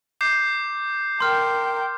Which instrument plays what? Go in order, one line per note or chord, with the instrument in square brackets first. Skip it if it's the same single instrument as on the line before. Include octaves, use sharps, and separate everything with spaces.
[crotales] D6 G6 C7
[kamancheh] A#4 G5 [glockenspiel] C6 F6